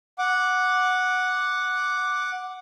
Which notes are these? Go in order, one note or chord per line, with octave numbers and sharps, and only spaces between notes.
F#5 D6